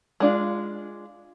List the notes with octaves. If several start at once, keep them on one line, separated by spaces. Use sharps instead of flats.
G#3 D4 F4